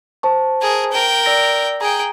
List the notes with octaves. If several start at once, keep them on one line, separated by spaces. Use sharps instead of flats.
C5 A5 C#6
G#4 A#4
A#4 G5
D5 E6 A#6
G#4 G5 A#5 D7